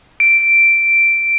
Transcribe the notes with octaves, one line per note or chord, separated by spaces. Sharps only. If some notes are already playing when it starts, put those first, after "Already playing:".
D7